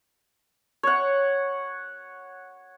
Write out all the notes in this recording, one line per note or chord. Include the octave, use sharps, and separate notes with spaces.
C#5 F#5